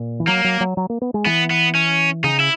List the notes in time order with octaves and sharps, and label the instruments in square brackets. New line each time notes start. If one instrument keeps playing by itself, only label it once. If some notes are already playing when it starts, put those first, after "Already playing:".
Already playing: [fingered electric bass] A#2
E3
[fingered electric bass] F#3 [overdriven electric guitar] A#3
[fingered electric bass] F#3
F#3
F#3
A#3
B3
G#3
[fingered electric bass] E3 [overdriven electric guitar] B3
[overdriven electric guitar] B3
C#4
[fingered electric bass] C#3 [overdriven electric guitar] D#4
[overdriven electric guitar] E4